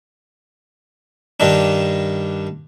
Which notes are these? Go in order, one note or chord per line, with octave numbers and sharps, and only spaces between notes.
G2 D#3 D4